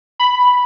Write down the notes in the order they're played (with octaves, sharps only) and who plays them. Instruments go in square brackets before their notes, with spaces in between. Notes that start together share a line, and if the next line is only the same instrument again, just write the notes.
[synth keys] B5